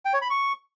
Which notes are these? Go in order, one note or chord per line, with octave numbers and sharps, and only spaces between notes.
G5
C#5
B5
C#6